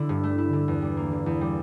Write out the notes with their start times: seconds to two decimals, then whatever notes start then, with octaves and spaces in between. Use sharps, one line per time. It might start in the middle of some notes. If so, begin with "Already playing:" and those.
Already playing: D3 E4
0.09 G2
0.24 A3
0.38 E4
0.53 D3
0.68 E2
0.82 G3
0.97 A#3
1.12 D3
1.26 E2
1.41 G3